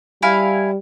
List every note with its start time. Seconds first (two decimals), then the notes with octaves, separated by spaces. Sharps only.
0.22 G3 E4 F5 G#5